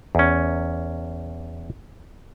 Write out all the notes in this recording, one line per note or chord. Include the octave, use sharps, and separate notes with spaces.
E2 C#4